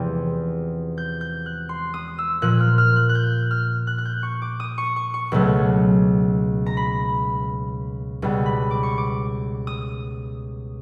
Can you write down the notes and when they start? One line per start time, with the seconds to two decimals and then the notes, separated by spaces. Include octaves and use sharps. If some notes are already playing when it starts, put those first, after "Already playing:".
Already playing: E2 C3 F3 G#3 C4
0.98 G6
1.21 G6
1.46 F#6
1.69 C6
1.94 D#6
2.18 E6
2.42 A#2 F3 A#3 F#6
2.60 F6
2.78 F6
2.96 F#6
3.09 F#6
3.15 G6
3.51 F6
3.87 F#6
3.98 F#6
4.05 G6
4.23 C#6
4.42 D6
4.60 D#6
4.78 C#6
4.96 C#6
5.14 C#6
5.32 C#2 B2 F#3 A3
6.66 A#5
6.77 B5
8.22 C#2 B2 G3 B3
8.46 B5
8.71 D6
8.83 C#6
8.98 D6
9.67 D#6